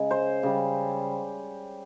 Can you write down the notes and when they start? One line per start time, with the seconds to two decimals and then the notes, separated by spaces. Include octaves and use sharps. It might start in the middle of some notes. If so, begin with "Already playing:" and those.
Already playing: C#3 G#3
0.11 C5
0.43 C#3 G3